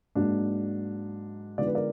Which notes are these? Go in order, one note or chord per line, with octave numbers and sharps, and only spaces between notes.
G#2 F#3 A#3 D4
D3 F3 G#3 B3 D#4 D5
B4
A#4 D5